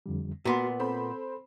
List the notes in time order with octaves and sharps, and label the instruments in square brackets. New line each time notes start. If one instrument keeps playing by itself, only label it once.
[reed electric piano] F2 D3 G3
[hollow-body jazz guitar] A#2 B3 [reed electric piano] F#4 C6
[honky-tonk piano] C4 C5 B5 [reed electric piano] A4